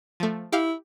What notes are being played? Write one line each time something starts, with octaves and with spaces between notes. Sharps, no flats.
F3 A3
E4 G4 F5